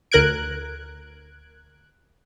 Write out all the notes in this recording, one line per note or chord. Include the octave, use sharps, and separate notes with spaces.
D2 A#4 F#6 G#6 D7